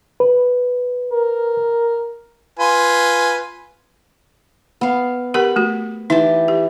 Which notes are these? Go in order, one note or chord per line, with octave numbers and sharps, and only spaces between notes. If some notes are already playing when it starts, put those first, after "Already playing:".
B4
A#4
F4 B4 G#5
B3 F5
G4 A#4 F#5 B5
A3 F#4
E3 D#4 G4 A5
G4